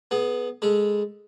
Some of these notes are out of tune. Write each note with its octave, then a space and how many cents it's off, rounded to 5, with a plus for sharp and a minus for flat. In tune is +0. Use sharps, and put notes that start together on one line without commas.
B3 +0 G#4 +30
G#3 +0 A4 +0 B5 -35